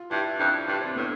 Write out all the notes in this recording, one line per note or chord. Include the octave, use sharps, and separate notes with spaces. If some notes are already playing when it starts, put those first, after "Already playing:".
Already playing: F4
G2 E4
F2 D4
G2 D4
C4
A2 B3